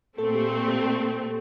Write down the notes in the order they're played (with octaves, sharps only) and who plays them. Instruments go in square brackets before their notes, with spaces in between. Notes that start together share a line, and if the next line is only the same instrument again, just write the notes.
[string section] A#2 A3 C4 [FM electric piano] A4
[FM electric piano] G4
A4
G4